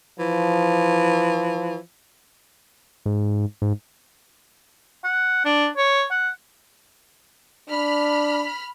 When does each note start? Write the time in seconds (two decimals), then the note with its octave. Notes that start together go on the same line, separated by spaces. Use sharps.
0.20 E3 F3
3.06 G#2
3.62 G#2
5.04 F#5
5.45 D4
5.77 C#5
6.11 F#5
7.69 D4 B5 F6